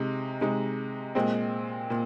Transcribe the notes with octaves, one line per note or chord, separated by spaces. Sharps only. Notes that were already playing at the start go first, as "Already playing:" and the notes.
Already playing: C3 G#3 D#4
C3 G#3 D#4
A#2 G#3 C4
A#2